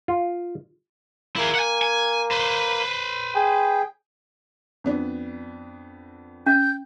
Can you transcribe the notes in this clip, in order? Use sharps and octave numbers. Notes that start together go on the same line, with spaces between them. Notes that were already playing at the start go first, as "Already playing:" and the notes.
F4
A#3 E4 G#4
F#5 G#5
G#5
B4 C5
G#4 G5
F2 B3 D4
C#4 G6